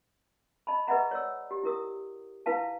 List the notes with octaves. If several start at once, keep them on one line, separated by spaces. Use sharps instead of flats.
D#5 A5 B5
G#4 B4 D#5 E5 F#5 A#5
C#5 D5 E6
G4
E4 A#4 D#6
E4 B4 F5 A5